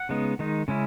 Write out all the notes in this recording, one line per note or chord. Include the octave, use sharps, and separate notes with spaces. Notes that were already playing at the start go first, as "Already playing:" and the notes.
Already playing: F#5
C#3 G#3 B3 D#4
D#3 G#3 D#4
C#3 G#3 C#4 E4